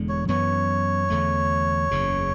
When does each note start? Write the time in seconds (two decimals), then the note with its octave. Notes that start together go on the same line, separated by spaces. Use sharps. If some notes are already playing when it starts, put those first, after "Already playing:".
Already playing: E1 E2 D3 G#3
0.09 C#5
0.28 F#2 E3 B3 C#5
1.10 E2 D3 A3
1.91 F#1 E2 C#3